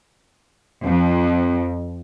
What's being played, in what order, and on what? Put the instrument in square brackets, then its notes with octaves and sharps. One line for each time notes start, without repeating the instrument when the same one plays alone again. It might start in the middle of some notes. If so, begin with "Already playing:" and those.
[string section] F2